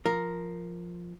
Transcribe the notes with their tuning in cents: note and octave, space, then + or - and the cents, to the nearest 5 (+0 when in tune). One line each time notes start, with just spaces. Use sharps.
F3 +0 A#4 +0